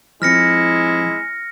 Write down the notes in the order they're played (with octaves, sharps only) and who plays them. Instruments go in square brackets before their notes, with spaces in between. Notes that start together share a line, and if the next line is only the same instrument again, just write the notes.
[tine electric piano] F3 C4 [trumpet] G#3 [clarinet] E4 [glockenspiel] F6 A#6 C#7